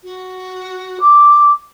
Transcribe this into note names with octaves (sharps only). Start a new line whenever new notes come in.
F#4
D6